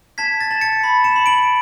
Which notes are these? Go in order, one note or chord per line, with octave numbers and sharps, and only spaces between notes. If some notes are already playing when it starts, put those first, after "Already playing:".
A5 G#6 B6
A6
A5
A6 C#7
B5
C#7 E7
B5
D7 F#7